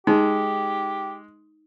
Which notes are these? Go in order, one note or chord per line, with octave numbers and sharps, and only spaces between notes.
G#3 D#4 G4